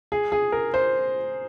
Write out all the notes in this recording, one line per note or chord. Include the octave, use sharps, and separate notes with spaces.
G#4
G#4
A#4
C5